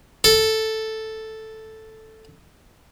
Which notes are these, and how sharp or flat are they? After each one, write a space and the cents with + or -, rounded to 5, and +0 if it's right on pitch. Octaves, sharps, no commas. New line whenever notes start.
A4 +0